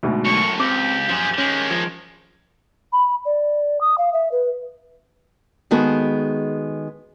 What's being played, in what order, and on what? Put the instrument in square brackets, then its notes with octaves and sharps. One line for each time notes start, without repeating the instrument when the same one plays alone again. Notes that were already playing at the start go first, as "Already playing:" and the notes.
[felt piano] D2 G#2 B2
[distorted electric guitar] F#2 A2 [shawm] C#6
[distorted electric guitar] C#2 [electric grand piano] C4 [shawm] G4 [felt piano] D6
[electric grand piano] F#2 [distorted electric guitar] F3 G#4 [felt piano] E7
[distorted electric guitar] D#3 G#3 [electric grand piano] C#4
[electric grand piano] F3 [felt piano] G#6
[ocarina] B5
D5
D#6
F5
E5
B4
[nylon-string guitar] D#3 G#3 B3 F#4 G#4 A4